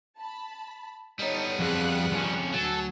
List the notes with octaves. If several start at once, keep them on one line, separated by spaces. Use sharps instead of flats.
A5 B5
G3 B3 D#4 A4 C#5
F2 G#4 F#6 C#7
F2 C#4
D2 F#3 A4 G#5